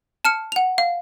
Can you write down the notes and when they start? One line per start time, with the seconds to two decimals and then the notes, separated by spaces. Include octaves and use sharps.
0.25 A5 F6 C#7
0.52 F#5 F7
0.78 F5